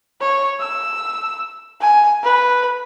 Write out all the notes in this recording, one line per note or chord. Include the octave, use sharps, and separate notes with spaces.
C#5
E6
G#5
B4